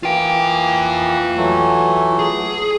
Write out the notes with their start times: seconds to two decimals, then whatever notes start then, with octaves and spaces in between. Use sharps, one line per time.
0.03 E3 A#3 F4 G5
1.36 E3 F#3 A3
2.19 G#4